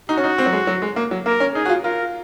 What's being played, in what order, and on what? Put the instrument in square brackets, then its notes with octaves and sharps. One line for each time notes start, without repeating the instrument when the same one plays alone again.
[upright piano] D#4 [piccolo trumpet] F#4
[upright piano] C#4
D#4
C4
F#3
G#3
F#3
G#3
A#3
F#3
[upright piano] A#3 [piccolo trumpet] A#4
[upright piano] C#4
[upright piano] D#4 [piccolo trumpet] G#4
[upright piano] F#4
F4
[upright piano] F4 [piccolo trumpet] A#4